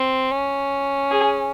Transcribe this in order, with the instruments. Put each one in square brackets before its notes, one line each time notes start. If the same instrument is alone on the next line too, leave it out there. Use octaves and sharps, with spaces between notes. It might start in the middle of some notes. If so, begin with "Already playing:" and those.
Already playing: [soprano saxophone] C4
C#4
[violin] G#4